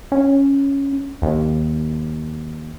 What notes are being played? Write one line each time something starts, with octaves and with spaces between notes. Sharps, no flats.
C#4
D#2